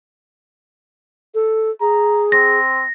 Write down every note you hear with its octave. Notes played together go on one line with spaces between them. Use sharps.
A4
G#4 A#5
C4 A#6